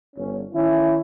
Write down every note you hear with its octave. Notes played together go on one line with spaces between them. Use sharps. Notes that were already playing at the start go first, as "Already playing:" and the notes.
G1 C#4
D#3 C#4 E4